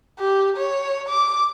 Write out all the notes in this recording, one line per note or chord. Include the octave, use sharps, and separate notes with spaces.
G4
C#5
D6